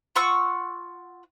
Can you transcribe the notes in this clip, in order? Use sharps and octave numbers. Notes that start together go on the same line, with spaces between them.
F4 F#5 C#6 E6